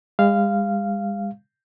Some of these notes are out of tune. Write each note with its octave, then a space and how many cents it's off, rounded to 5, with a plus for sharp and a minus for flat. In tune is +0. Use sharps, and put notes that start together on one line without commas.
G#3 -45 F5 -10